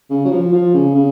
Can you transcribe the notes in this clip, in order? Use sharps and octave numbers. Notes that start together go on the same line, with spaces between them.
C#3
F#3
F3
F3
C#3
C#3